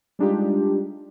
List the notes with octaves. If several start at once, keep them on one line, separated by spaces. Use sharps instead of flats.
G3 G#3 D4 D#4 F4 G4